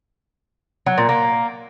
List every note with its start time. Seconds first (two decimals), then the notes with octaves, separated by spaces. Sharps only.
0.86 F#3
0.98 A#2
1.09 A#3